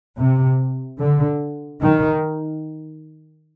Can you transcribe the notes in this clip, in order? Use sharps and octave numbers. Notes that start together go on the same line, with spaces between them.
C3
D3
D#3